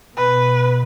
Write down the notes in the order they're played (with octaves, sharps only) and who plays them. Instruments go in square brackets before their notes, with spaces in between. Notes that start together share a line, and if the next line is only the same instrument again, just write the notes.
[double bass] B2 [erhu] B4